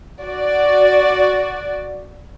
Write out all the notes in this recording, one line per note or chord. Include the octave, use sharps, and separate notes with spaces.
F#4 D5